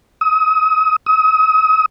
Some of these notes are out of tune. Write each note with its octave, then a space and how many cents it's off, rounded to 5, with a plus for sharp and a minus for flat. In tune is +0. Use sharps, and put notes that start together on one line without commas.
D#6 +35
D#6 +40